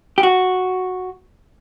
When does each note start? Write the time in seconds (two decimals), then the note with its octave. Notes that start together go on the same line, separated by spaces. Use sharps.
0.18 G4
0.23 F#4